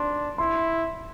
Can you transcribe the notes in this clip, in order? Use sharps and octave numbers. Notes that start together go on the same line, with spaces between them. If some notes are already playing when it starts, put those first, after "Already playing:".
Already playing: D4 C6
E4 C6